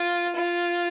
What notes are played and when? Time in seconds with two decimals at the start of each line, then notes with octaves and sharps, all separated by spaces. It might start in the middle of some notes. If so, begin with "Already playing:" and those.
Already playing: F4
0.36 F4